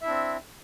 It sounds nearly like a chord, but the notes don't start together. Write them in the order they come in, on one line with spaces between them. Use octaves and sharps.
E5 E4 D4 C4